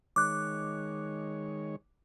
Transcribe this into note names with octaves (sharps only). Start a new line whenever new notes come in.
D#3 G#3 C#5 D6 F#6